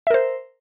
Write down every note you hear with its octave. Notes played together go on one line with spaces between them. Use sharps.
A#4 C5 E5